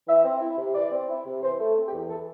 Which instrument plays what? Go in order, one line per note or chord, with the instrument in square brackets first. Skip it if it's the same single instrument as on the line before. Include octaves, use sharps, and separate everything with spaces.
[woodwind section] E3 E5
C4
E4
C3
E3 D5
C4
E4
C3
E3 C5
A3
C4
G4
E2
E3 A4